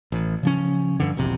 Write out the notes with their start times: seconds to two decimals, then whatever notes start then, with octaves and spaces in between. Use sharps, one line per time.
0.12 A1
0.43 C#3 F3 C#4
1.00 G2 D3
1.17 E1 A#1 C3